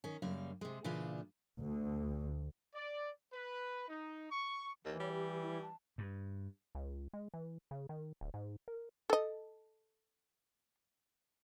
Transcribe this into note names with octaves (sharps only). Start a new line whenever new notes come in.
D#3 C#4
F#2 C#3 G3 A#3 F5
C3 G#3
A#2 C#3 E3 D4 F4
D2
D5
B4
D#4
C#6
D#2 E3
G3 C#5
G4
E4
A5
G2
C#2
G#3
E3
C#3
D#3
D1
G#2
A#4
A4 D#5